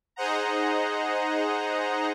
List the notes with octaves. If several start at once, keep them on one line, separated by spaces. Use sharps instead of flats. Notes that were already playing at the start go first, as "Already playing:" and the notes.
D#4 G#4 C5 D#5 F#5 A#5